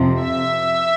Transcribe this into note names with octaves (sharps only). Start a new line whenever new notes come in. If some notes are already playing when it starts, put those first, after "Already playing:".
Already playing: F2 C3 F3
E5